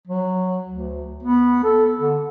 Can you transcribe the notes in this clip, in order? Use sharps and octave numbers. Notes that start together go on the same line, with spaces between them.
F#3
D2
B3
A4
D3